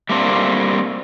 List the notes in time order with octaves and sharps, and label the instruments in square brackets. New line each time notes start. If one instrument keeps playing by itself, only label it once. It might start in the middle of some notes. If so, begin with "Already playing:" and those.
[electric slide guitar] G3 A3 A#3 C4 D4